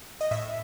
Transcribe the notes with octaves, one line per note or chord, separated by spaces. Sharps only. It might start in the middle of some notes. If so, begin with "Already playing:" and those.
D#5
A2 E5